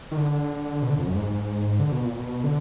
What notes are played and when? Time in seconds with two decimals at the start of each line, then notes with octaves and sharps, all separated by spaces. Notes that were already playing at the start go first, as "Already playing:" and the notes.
0.11 D#3
0.17 D3
0.82 B2
0.90 D3
0.98 F2
1.07 F#2
1.15 G#2
1.79 D3
1.92 B2
2.05 A#2
2.18 B2
2.44 D3